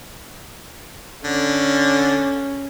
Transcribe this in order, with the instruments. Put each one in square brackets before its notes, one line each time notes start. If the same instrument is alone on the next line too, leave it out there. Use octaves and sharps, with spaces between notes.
[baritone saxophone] D3 [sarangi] C#4